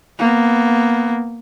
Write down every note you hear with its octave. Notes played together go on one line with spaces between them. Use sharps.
A#3 B3